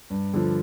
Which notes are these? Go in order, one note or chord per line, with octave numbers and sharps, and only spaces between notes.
G2
D3 F3